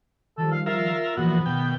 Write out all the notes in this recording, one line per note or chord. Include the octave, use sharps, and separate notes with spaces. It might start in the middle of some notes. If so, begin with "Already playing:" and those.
D#3 F3 G3 A4
F5
F4 A#4 E5 F5
A#2 E3 F3 B3 F#4
B2 D#3 G5